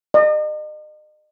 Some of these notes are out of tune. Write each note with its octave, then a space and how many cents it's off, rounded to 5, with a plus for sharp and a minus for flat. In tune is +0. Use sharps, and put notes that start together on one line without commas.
D#5 -40